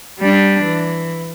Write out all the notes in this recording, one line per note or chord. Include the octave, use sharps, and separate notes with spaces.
G3 D4
E3